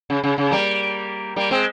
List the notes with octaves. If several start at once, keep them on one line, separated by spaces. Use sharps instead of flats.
C#3
C#3
C#3
G3 A#3
G3 A#3
G#3 C4